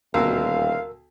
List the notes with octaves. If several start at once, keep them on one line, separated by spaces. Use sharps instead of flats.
D#1 D2 B2 A#4 F5 E6